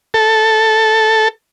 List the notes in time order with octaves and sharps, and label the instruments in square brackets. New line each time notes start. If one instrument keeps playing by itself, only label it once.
[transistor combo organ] A4